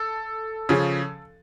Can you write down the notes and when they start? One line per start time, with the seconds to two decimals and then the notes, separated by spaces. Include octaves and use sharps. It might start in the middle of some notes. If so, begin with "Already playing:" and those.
Already playing: A4
0.69 C#3 F3 C#4